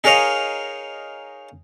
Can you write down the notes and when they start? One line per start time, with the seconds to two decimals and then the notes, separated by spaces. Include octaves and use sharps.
0.04 D#4 G#4 A#4 C#5 D#5 F5